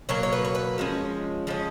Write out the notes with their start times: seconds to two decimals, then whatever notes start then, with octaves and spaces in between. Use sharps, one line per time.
0.09 B2 F#3 A#3 C#5
0.23 C#5
0.33 B4
0.45 C#5
0.55 B4
0.78 F3 G#3 C#4
1.47 F3 G#3 C#4